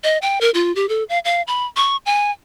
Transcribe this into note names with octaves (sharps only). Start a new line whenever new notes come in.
D#5
G5
A#4
F4
G4
A4
F5
F5
B5
C#6
G#5